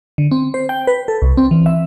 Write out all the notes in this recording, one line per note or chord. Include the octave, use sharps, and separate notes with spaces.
D3
C4
C5
G5
B4
A4
C2
C4
E3
E5